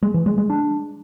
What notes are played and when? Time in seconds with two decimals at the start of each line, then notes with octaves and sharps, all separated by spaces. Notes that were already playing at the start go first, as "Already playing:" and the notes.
0.03 G#3
0.14 E3
0.26 G#3
0.38 G#3
0.50 D4